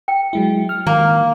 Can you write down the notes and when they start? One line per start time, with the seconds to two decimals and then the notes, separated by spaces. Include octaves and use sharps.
0.08 G5
0.33 F#3 G#3 E4
0.69 F6
0.87 D#3 A#3